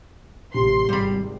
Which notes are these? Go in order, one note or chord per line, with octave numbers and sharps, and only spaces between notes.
A1 C3 C6
G#1 G3 B5